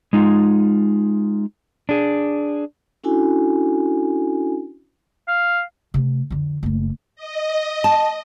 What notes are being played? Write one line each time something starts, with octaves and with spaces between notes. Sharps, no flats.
G#3 D#4 F4
D4 G#4
C#4 D4 E4 F#4 A4 G#5
F5
C3 A3
F2 D3
F#1 A3
D#5
A5